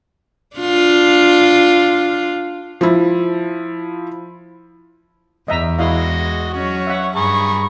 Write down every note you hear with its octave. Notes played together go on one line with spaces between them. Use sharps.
D4 F4
F3 E4
E2 D#5 E5 A#5
G#3 E4 F#4 D#5 F5
F#3 C#4 F#4 C#5
E5 F#5
G2 G#4 A#5 B5 C#6